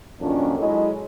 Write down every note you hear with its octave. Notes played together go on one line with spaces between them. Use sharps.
F2 A#2 D#3 F#3 C#4 D4
F#3 G#3 E4 G#4 A4 D#5